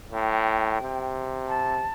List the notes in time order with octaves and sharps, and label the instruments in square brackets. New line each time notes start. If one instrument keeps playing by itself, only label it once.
[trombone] A2 [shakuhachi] G5
[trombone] C3
[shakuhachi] A5